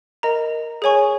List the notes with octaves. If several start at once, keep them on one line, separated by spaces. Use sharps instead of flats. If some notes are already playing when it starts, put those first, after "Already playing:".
A#4 D#5 A#5
G#4 C#5 G#5 C#6